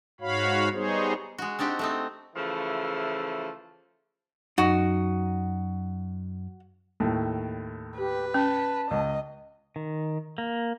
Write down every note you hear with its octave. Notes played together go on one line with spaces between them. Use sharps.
G#2 F#4 C#5 F5 B5
G3 B3 D#4 G#4 C5 C#5
G#3 F#4
C4 D4 D#4 F#4 G4
A3 C4 D#4
C#3 E3 F3 A3
F#2 D#4 F#4
D#2 A2
G4 B4
C#4 A5
C#2 D#5
D#3
A#3